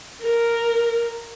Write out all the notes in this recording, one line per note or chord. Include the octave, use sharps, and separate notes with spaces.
A#4